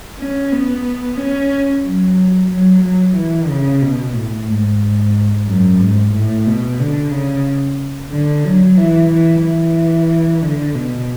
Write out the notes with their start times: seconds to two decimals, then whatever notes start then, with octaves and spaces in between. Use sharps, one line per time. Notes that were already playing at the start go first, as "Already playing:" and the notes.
0.19 C#4
0.52 B3
1.18 C#4
1.84 F#3
2.50 F#3
2.83 F#3
3.15 E3
3.49 C#3
3.82 B2
4.15 A2
4.49 G#2
5.47 F#2
5.80 G#2
6.14 A2
6.46 B2
6.80 D3
7.12 C#3
8.10 D3
8.45 F#3
8.77 E3
9.10 E3
9.43 E3
10.42 D3
10.75 B2